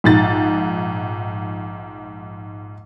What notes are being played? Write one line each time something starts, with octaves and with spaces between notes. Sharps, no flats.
A#1 G#2 A6